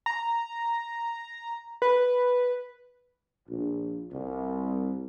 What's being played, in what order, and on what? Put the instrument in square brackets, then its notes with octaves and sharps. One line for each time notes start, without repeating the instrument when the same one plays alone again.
[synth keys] A#5
B4
[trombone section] A#1
C2